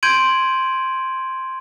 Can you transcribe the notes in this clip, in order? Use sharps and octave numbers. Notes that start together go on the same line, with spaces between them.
C6 G6 G#6 D7 D#7 F#7